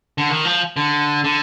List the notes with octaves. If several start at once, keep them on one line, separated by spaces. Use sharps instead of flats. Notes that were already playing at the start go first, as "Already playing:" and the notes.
D3
D#3
F3
D3
D3